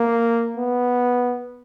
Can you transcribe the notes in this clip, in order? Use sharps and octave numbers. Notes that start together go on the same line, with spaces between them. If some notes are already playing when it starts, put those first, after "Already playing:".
Already playing: A#3
B3